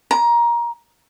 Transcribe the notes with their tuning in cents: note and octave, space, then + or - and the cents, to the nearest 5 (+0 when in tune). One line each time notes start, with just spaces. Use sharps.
A#5 +20